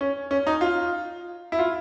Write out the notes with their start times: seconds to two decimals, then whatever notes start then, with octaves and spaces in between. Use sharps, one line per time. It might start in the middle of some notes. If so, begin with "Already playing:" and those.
0.01 C#4
0.31 C#4
0.47 D#4
0.61 F4
1.52 E4
1.59 F4